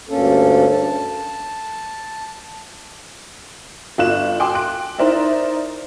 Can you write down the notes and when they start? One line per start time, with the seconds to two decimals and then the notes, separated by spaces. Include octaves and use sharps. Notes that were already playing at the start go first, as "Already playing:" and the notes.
0.09 D2 G2 A#3 C#4 A4
0.72 A5
3.98 G1 F4 F#6 E7
4.40 G5 G#5 C6 D6
4.55 F#6 D7
4.98 D#4 E4 A#4 C5 D5 E5